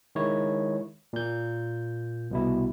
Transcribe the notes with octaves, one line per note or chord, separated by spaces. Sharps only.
D#3 G#3 E4 C#5
A#2 G6
C2 B2 E4